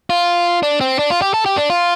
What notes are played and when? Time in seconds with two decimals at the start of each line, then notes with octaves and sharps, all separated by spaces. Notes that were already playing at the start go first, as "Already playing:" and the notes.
0.10 F4
0.63 D4
0.81 C4
0.99 D4
1.10 F4
1.22 G4
1.34 A4
1.46 G4
1.57 D4
1.70 F4